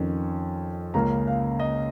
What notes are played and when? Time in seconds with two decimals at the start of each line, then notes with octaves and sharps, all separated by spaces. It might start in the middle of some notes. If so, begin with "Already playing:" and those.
Already playing: F2 D#3 C#4
0.94 C#2 C#3 A#3 C#4 A#5
1.27 F5
1.60 D#5